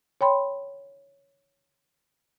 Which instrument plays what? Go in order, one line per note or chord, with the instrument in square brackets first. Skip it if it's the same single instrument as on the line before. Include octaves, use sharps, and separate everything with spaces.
[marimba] C#5 G5 B5 C6